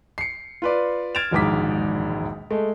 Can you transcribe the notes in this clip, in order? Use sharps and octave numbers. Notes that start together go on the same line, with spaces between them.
C7 C#7
F4 B4 D5
F6 G#6 A6 D7 E7 F7
E1 A#1 D#2 G#2 D6 B6
G#3 A3